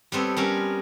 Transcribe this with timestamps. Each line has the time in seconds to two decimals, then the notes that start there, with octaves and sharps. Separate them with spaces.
0.12 G3 B3 C4 A4 C#5
0.37 G3 B3 C#4 A#4